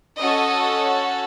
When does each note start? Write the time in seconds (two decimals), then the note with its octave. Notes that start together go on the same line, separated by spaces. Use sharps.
0.18 C#4 F#4 A4 D#5